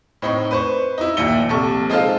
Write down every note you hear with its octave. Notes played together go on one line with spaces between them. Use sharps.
A2 C4 D#4 B5 C#6
B4 C5 C#6
D#4 E4
A#1 D#2 A#2 E5 C#7 G7
A#1 C3 A4 C#6
G#3 D#4 F4 A4 C5 F5